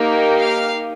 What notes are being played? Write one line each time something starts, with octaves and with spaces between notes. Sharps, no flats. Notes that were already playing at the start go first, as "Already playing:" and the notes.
Already playing: A#3 D#4 G4
F5